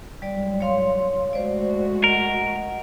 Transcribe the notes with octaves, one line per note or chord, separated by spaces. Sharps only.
G#2 F#3 G3 D5
C#5 F5 C6
G#3 A3 F#4 C5 D5
A#4 D#5 F#5